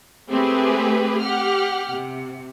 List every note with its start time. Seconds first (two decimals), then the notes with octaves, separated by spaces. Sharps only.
0.30 A3 C4 G4 G#4 B4
1.21 G4 F#5 F6
1.91 C3